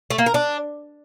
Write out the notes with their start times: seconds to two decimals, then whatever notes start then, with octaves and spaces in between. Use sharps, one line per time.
0.10 A3
0.18 A#3
0.26 A#4
0.34 D4